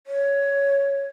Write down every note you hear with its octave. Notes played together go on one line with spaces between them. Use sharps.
C#5